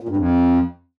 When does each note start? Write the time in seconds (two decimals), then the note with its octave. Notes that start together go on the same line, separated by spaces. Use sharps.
0.01 A#2
0.09 G2
0.17 F2